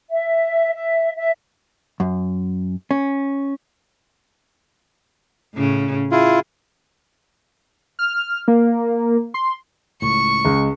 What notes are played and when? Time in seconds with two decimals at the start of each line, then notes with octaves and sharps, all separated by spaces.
0.11 E5
0.74 E5
1.17 E5
2.00 F#2
2.91 C#4
5.54 A2 C#3
6.12 E4 F4 G#4
7.99 F6
8.48 A#3
9.34 C6
10.02 C#2 A2 C#6
10.45 C#2 G#3